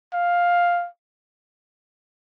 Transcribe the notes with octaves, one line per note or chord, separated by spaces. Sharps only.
F5